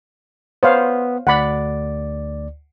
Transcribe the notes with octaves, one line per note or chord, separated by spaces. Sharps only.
B3 C5 C#5 F5
D2 D5 F#5 B5